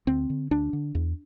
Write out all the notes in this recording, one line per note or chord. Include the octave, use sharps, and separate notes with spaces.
D2 C4
D3
D2 D4
D3
E2